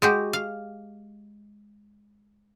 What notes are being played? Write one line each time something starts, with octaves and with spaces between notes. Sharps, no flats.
G#3 F#4 G4
F5